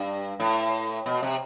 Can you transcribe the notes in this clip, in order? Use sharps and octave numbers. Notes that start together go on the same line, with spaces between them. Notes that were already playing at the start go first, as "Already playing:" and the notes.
Already playing: G2
A2
B2
C3